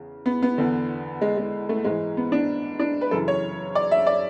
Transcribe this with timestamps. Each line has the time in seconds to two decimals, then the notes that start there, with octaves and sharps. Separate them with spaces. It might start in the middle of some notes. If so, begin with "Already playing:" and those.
Already playing: E2 C#3
0.26 B3
0.43 B3
0.58 E2 D3
1.22 G#3
1.37 G#3
1.69 A3
1.84 G#2 E3 G#3
2.17 B3
2.32 D4
2.80 D4
3.01 B4
3.11 F#2 C#3 E3 A4
3.28 C#5
3.75 D5
3.91 E5
4.07 D5